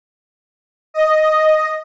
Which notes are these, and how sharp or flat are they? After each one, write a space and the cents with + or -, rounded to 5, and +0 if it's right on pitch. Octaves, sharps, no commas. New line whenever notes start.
D#5 +0